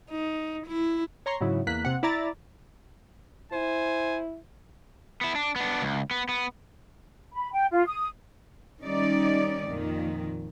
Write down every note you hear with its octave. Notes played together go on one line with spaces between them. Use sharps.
D#4
E4
C#5 A#5 C6 C#6
G#2 C#3 F#3 C#4 E4
E2 A#3 F#6 B6
C3 F#5
E4 D5 A#5 A6
E4 C5 G#5
B3 E4
D4
B3 D4
C#2
B3
B3
B5
G5
F4
D#6
D#3 G3 C#4 D#4 D5
F2 A#2 D#3